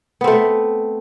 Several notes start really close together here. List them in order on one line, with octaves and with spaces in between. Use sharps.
B3 C4 A3